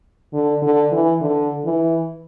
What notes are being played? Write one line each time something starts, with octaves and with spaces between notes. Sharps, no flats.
D3
D3
E3
D3
E3